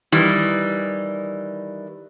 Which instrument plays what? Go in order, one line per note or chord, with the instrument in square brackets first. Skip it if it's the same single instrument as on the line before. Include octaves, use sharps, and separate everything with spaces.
[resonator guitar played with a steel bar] D#3 E3 G3